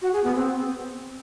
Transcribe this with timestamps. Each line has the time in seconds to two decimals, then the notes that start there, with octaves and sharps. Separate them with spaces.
0.02 F#4
0.13 G#4
0.24 B3
0.35 C4